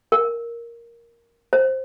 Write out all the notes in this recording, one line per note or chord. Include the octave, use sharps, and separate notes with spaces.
A#4
C5